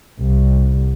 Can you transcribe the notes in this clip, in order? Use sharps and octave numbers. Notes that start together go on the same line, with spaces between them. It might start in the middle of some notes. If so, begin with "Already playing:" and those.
C2